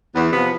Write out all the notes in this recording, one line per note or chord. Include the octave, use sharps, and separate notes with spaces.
E2 B3
C3 F3 B3